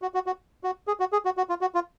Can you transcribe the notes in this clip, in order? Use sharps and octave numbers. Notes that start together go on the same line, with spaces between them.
F#4
F#4
F#4
F#4
G#4
F#4
G#4
F#4
F#4
F4
F#4
F4